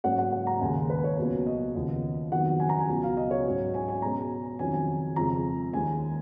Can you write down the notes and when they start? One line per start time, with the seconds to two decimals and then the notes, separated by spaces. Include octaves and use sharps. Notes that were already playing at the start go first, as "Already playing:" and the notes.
0.04 G#2 F#3 A#3 C#4 F#5
0.18 F#5
0.32 F#5
0.47 A#5
0.61 D#2 C#3 G#3 G#5
0.90 B4
1.04 C#5
1.18 C#2 B2 F#3 A#3 C#4
1.46 D#5
1.75 D#2 C#3 F3 B3
2.32 F2 D#3 F#3 B3 F#5
2.60 G#5
2.69 A#5
2.79 G#5
2.89 C#2 B2 F#3
3.03 F5
3.17 D#5
3.31 C#5
3.46 G#2 F#3 C#4
3.74 G#5
3.88 G#5
4.02 B2 G#3 C#4 A#5
4.59 F2 D#3 F#3 C#4 G#5
4.74 G#5
5.16 F2 C#3 F3 G#3 A#5
5.73 D#2 D#3 G#3 C#4 G#5